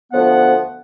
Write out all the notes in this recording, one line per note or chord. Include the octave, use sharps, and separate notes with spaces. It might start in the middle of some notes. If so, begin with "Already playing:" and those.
D2 F3 B3 F#5